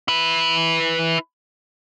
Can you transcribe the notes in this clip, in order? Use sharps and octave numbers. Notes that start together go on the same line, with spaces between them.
E4 B4